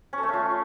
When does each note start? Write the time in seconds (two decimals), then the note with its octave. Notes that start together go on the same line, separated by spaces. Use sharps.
0.13 C#4
0.18 A4
0.23 A3
0.28 C#4
0.33 F4